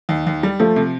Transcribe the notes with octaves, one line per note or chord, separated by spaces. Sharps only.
D#2
D#2
G3
F3 A3
C3